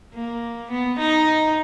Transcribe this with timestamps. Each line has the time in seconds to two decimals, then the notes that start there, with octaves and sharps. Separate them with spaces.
0.14 A#3
0.71 B3
0.99 D#4